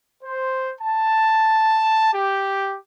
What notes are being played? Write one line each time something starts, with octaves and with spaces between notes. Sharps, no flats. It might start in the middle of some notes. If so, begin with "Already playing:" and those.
C5
A5
G4